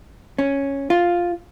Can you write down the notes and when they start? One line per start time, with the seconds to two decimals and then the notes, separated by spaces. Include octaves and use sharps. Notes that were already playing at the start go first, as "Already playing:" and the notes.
0.39 C#4
0.90 F4